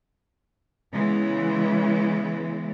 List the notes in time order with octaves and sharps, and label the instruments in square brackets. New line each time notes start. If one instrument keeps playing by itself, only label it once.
[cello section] C#3 E3 G#3 B3